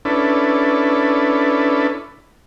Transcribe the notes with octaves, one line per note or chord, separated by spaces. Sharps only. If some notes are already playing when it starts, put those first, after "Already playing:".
C#4 D4 E4 A4 B4